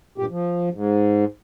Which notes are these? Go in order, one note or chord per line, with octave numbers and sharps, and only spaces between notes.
G2 A#2 G4
F3
G#2